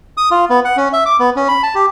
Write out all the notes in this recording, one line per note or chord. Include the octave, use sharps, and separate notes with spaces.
D#6
F4
B3
F#5
C#4
E5
D6
B3
C#4
B5
A5
G4